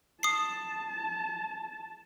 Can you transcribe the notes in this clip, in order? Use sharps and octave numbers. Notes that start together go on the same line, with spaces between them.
A5 D#6 C7